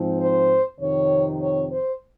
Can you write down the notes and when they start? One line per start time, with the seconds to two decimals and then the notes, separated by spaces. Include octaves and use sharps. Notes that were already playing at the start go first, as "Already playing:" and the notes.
Already playing: G#2 F3 C4
0.19 C5
0.80 F2 C3 D#3 C#5
1.40 C#5
1.70 C5